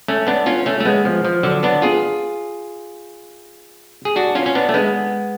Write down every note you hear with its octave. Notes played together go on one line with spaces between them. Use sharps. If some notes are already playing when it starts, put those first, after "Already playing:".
A3 C#4
B3 D4
C#4 F4
A3 C#4
A3
G#3 B3
F3
F3
D3 F#3
B3 D4
F4 G#4
G#4
D4 F#4
C#4 F4
C#4
B3 D4
A3
G#3 B3